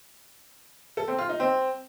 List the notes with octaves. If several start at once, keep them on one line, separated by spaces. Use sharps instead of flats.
A4
C4
F4
D#4
C4